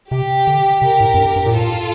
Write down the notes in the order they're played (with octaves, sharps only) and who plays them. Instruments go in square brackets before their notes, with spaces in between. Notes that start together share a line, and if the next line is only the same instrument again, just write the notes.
[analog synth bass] C3 [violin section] G4
[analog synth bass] D3
[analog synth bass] C3 [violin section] G4 A#4
[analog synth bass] A2
F2
G2
G2
A#2
[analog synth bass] A2 [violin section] F4 A4